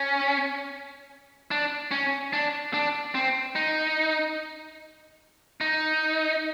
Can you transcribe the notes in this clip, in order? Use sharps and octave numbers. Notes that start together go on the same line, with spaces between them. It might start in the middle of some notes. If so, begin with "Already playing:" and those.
Already playing: C#4
D4
C#4
D4
D4
C4
D#4
D#4